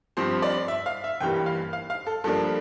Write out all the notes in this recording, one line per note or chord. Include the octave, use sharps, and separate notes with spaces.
G2 F3 C4 C5
D5
E5
F5
E5
G1 G2 E3 G3 A#3 G5
F5
F5
F5
A4
G2 F3 A#3 D4 A4